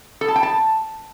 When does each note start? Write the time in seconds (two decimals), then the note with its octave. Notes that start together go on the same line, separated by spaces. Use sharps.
0.21 A4
0.28 A5
0.36 G5
0.43 A5